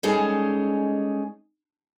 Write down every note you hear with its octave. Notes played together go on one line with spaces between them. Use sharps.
G3 G#3 C#4 D#4 G#4 A4